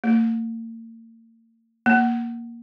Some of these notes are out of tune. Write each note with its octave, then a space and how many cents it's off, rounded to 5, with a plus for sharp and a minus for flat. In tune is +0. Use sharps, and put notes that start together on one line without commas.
A#3 -40
A#3 +5